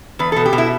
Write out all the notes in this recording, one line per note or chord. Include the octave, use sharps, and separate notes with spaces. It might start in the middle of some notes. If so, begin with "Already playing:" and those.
E2 B4
A4
B2
G4
B2
E4